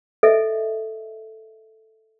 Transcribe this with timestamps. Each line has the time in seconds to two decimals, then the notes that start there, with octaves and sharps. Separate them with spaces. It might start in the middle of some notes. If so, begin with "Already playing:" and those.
0.23 A4 D#5 E5